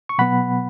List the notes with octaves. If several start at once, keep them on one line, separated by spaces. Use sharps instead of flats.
C#6
B2 F#3 B3 F#5 B5